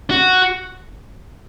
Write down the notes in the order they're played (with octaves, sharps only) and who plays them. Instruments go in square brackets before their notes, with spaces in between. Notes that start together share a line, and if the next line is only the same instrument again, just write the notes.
[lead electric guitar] F#4